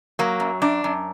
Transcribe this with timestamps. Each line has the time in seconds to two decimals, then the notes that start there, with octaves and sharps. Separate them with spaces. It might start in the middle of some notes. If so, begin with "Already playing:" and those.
0.19 F#3 A#3
0.40 F#2
0.62 F#2 D4
0.84 F#2